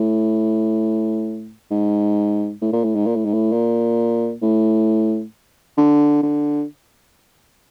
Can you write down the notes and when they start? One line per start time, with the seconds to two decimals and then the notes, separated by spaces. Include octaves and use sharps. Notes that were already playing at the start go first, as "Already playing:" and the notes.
Already playing: A2
1.71 G#2
2.62 A2
2.73 A#2
2.84 A2
2.95 G#2
3.06 A#2
3.16 A2
3.25 G#2
3.34 A2
3.52 A#2
4.42 A2
5.78 D3
6.23 D3